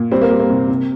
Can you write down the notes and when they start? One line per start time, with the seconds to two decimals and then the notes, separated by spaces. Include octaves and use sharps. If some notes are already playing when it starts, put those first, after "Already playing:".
Already playing: A#2
0.12 G3 C4
0.21 A#3
0.31 G3
0.40 A#3
0.50 C3
0.69 C3